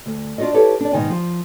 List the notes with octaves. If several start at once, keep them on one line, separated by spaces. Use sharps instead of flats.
D2
D4 F4 F#4 D5 D#5
E4 G4 A4 B4 C#5
D4 D5
G#2 B2 D#3 G#5
F3